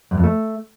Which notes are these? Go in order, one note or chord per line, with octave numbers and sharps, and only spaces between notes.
F#2
F2
A3